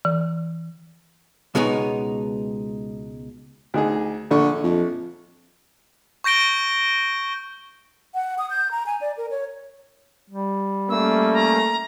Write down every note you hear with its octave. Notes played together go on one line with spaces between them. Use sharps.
E3
C#2 B2 G#3 B3 D#4 C#5
D2 D#4 G#4
A#1 D3 C#6
F2
C#6 G6 A#6 D7 G7
F#5
D#6
G6
A#5
G#5
D5
A#4
C#5
G3
A3 A#3 C#4 E6
A#5